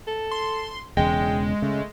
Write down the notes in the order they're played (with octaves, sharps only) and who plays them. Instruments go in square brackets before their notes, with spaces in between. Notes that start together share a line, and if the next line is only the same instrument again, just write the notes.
[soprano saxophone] A4
[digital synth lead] C6
[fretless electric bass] E1 E2 C#3 [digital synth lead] G#3 [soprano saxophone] G5
[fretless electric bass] C#3 [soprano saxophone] A3